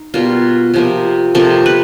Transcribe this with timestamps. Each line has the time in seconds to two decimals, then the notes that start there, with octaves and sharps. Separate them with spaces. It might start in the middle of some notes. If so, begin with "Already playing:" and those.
Already playing: D#4
0.14 B2 G3 A#3 F4
0.74 C3 F3 A#3
1.35 C3 F3 A#3 A4
1.66 B4